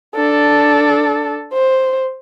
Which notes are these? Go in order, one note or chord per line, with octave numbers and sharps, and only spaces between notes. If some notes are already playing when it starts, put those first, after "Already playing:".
D4 A4
C5